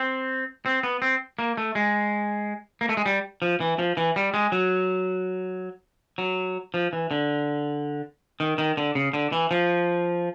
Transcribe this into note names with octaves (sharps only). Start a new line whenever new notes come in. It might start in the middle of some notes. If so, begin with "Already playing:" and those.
Already playing: C4
C4
B3
C4
A#3
A3
G#3
A#3
A3
G#3
G3
F3
E3
F3
E3
G3
G#3
F#3
F#3
F3
E3
D3
D#3
D#3
D3
C#3
D3
E3
F3